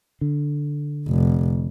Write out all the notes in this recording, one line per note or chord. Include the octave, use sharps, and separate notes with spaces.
D3
F1